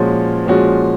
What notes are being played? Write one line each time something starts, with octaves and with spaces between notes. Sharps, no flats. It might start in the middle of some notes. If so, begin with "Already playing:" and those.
Already playing: A#2 F3 G#3 C#4 F#4
A#2 F3 G#3 C#4 F#4